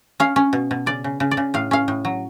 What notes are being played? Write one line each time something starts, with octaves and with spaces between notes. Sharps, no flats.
C#4 F5
C#4
B2
B2
C#3 D5
C#3
C#3
D5
C#3
A2 F5
C#4 F5
A2
F#3